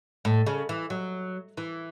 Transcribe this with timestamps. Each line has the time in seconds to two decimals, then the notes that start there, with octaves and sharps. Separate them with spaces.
0.25 A2
0.46 C#3
0.69 E3
0.90 F#3
1.57 E3